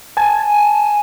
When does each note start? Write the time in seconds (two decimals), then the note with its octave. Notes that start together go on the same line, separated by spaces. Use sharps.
0.17 G#5 A5